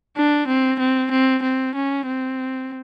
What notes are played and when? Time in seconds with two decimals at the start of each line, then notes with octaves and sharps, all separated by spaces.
0.17 D4
0.48 C4
0.80 C4
1.11 C4
1.43 C4
1.75 C#4
2.07 C4